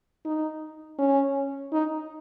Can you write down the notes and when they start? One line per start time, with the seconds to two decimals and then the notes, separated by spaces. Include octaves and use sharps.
0.25 D#4
0.99 C#4
1.72 D#4